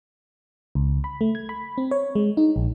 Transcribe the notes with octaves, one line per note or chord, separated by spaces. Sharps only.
C#2
B5
A3
G#6
B5
C4
C#5
G#3
D#4
A#1